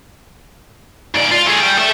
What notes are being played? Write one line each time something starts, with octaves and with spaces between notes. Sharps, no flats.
G#2 D5
F4
A3 G#4
G3 G5
A4 E5